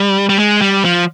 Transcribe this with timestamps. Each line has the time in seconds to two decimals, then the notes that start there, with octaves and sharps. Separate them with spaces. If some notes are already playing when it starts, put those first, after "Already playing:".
Already playing: G3
0.29 G3
0.39 G#3
0.61 G3
0.85 F3